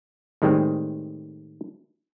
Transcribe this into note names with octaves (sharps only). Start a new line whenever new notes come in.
A2 D#3 G3 G#3 C4